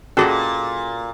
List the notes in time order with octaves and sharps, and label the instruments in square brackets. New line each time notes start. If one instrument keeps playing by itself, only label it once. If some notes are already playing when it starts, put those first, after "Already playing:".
[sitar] A#2 [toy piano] C#4 F#4 G#4 [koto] A4 D#5 F#5